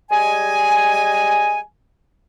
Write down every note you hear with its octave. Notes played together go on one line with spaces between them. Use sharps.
G3 G#3 D#5 G#5